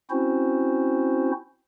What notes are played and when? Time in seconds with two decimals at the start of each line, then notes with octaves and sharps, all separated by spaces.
0.10 C4 C#4 E4 F#4 C5